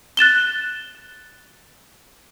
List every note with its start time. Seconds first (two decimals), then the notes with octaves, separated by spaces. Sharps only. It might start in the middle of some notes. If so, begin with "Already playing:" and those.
0.17 F#6 A6 E7 G7